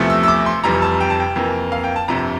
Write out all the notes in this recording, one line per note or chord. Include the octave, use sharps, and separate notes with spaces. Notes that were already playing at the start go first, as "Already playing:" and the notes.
Already playing: E2 C3 F3 A3
E6
E6
D6
C6
F1 F2 E3 G3 A#5
A5
G5
A5
G5
F2 E3 A#3
F5
G5
A5
G1 F2 C3 A#5